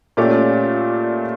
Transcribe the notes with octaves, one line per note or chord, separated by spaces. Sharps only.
A#2 A3 C#4 G4 D5